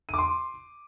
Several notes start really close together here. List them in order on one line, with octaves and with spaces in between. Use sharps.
D#7 D6 C6